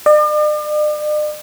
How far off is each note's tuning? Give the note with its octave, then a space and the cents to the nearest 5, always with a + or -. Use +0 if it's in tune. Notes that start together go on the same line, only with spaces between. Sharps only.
D5 +45